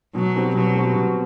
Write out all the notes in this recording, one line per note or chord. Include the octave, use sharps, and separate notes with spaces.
B2 F#3
G3 C4 F#4 B4
B2 F#3
G3 C4 F#4 B4
B2